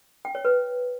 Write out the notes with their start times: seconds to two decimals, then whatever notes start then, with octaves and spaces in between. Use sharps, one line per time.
0.25 G5
0.35 C#5
0.45 B4